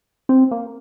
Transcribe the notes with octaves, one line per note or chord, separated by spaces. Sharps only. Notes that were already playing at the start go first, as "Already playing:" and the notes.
C4
A#3